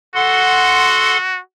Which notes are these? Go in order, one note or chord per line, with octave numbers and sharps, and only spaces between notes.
F#4 A4 F#5 C6